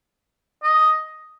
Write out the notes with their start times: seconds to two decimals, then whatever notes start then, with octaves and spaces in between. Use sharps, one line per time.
0.63 D#5